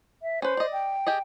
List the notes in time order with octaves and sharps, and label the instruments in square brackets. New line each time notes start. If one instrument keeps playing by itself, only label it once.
[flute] E5
[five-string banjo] C#4 B4 [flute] C5
[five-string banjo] D5 D#5
[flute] G5
[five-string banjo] G4 G#4 D#5